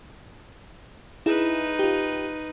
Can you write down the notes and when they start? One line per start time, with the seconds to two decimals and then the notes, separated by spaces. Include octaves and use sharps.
1.26 D#4 E4 G#4 B4
1.79 F4 G4